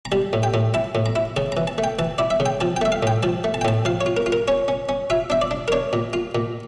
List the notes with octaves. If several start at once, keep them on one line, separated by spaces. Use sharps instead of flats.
A#5
G3 A5
A2
G5
A2
E4 A5
A2
A#5
E4
C#3 A5
A#5
E3
A5
A3
G5
E3 A5
E4 D5
E5
C#3
G5
F3 A5
G5
A3 E5
F5
A2 G5
F3 A5
A3
A5
G5
A2 A5
F3 F5
C#5
F4
A#4
F4
A#4
C#4 C#5
C#4
C#4
F4 E5
D4 E5
D5
D4
A#4
D4 C#5
A#2
F4
A#2